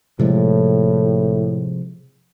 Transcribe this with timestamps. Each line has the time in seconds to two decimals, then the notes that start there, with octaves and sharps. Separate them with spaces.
0.19 A2 C3 F3 G#3